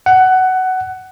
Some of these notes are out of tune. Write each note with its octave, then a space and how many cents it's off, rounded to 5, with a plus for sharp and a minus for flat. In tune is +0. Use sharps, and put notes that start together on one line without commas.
F#5 +15